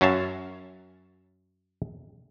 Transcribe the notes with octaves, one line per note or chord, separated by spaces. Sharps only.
F#2 F#3 C#4 E5 F5 A5